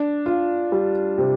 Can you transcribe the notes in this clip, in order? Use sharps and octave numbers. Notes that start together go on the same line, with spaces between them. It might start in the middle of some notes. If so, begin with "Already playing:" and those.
Already playing: D4
F4
G3
C3